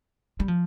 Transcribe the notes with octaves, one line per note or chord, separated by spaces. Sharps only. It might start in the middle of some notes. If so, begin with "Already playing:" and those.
G3
F3